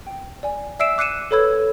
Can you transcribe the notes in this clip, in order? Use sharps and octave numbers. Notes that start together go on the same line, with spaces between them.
G5
D5 G#5
D5 E5 E6 C7 D7 E7
D6 F#6 C7 C#7 D#7 E7
A4 B4 C#5 B5 E6 G#6